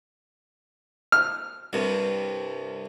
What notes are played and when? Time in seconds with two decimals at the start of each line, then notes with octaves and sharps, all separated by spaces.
1.12 F6
1.73 C2 G2 C3